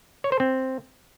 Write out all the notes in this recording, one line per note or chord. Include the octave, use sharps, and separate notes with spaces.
C#5
C5
C4